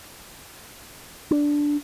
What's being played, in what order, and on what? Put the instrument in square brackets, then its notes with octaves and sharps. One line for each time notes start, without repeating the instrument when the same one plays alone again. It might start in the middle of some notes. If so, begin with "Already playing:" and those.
[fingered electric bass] D4